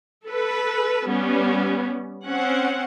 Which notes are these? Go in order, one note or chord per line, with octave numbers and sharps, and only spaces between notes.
A4 B4
G3 B3 C#4
C4 C#4 F#5